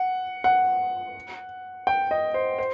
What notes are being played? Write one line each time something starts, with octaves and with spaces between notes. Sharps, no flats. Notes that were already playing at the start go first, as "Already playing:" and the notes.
Already playing: F#5
F#5
G5
D#5
C5
C5